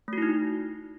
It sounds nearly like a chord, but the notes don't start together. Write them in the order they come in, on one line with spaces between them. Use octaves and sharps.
A3 F#4 E4 D#4